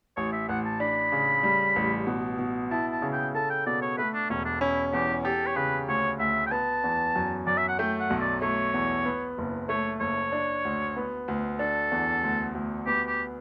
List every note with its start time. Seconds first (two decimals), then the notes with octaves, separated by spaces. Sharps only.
0.17 A1 C#5
0.33 E5
0.49 A1 F#5
0.65 A5
0.80 D4 B5
1.12 C#3
1.43 G3
1.76 A1
2.07 B2
2.39 B2
2.71 E4 A5
2.92 A5
3.02 C#3
3.13 G5
3.35 A4 A5
3.50 G5
3.66 B2 D5
3.82 C#5
3.98 A3 B4
4.14 D4
4.30 E1 C#4
4.45 D4
4.61 C#4 E4
4.93 E2 G4
5.24 G4 A4
5.47 C#5
5.56 C#3 B4
5.88 D2 C#5
6.19 D2 E5
6.47 G5
6.51 B3 A5
6.84 E2
7.16 F#2
7.47 F#2 D5
7.58 E5
7.68 F#5
7.79 A3 G5
8.00 F#5
8.10 B1
8.21 D5
8.42 A3 C#5
8.74 E2
9.05 B3
9.38 F#1
9.69 A3 C#5
10.00 F#1 C#5
10.32 D4
10.65 D2
10.97 B3
11.28 D2
11.59 D4 A4
11.91 E2
12.23 D2
12.55 D2
12.87 B3 G4
13.08 G4